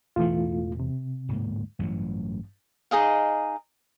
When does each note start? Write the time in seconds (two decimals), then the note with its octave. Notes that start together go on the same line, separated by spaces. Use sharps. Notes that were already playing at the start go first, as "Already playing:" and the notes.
0.16 E1 E2 A2 E3 A3 F4
0.80 C3
1.29 D1 G#2 A#3
1.79 A1 G2 E3 F#3
2.91 D#4 G#4 D#5 F5